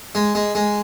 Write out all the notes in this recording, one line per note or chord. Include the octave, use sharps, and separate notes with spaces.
G#3
G#3
G#3